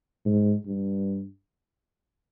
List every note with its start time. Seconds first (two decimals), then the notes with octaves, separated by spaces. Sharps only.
0.25 G#2
0.66 G2